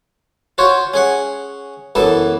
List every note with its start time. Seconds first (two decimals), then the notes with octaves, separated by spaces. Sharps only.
0.58 F4 F#4 C5 C#5
0.94 C#4 G#4 F#5
1.95 F#2 E3 B3 A4 A5